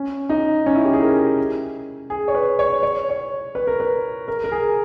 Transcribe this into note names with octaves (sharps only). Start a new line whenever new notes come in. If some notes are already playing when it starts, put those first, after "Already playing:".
Already playing: C#4
D#4
C#4
E4
G4
G#4
A#4
G#4
C#5
B4
C#5
C#5
C#5
B4
A#4
B4
A#4
A#4
G#4